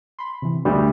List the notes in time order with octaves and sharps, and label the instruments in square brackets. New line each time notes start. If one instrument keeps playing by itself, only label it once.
[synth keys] B5 C6
C3 E3
[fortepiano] D2 G3 [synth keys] A3 D4